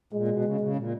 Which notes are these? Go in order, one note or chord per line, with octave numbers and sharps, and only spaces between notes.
A#2 G#3
B2
C#3
C#3
A#2